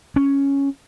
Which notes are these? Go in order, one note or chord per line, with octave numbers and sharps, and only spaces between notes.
C#4